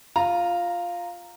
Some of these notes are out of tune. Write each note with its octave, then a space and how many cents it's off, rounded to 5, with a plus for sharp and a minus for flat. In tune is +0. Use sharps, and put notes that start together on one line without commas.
F4 +0 A#5 -10